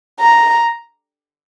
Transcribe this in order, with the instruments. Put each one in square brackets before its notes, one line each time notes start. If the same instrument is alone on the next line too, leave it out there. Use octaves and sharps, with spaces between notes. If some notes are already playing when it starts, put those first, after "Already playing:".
[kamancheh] A#5